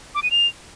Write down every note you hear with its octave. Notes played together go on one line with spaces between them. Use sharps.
D6
D#7
F7